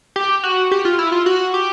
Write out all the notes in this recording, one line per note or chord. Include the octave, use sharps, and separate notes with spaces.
G4
F#4
G4
F4
E4
F4
F#4
G4